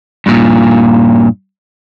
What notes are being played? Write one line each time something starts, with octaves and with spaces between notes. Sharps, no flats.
G2 A#2